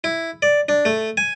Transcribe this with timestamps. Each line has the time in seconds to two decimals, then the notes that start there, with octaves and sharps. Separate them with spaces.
0.04 E4
0.42 D5
0.69 D4
0.85 A3
1.17 G#5